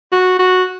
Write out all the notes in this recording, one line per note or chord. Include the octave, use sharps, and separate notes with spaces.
F#4
F#4